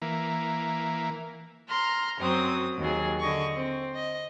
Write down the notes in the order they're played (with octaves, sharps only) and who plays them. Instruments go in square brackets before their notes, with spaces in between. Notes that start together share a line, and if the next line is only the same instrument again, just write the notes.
[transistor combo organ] E3 A#3
[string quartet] A#5 C6 F6
F#2 F#3 C4 D#6
D#2 F#3 G#4
D3 D#5 C#6
C4
D#5